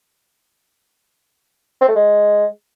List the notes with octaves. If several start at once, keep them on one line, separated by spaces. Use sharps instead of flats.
C4
A3
G#3